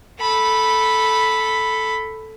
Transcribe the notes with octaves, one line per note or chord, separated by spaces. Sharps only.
A4 B5